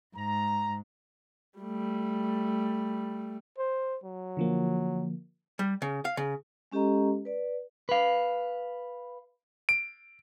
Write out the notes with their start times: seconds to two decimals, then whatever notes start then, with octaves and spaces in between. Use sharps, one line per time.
0.16 G#2 A#5
1.59 G3 A3
3.59 C5
4.04 F#3
4.37 D3 F3 A#3
5.59 G3
5.82 C#3
6.05 F5
6.17 C#3
6.72 G#3 C#4 G4 A4 D#5 A#5
7.25 B4 D5
7.89 B4 F5
9.69 D7